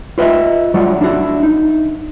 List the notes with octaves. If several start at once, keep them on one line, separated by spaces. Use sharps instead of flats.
F4 B4 D#5 E5
F#3 G3 D4 F4 F#4
D4 E4 F#4
D#4